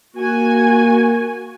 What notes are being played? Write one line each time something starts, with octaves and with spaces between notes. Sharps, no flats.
A#3 F#4 G#5